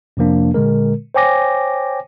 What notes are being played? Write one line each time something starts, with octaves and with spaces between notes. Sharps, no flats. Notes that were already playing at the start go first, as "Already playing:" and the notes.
F2 C3 F3 A#3 D4
A#2 D3 G#3 A#4
C5 C#5 G5 G#5 D6 A#6